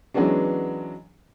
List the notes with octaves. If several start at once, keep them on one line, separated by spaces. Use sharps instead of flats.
E3 F#3 G#3 B3 C#4 D4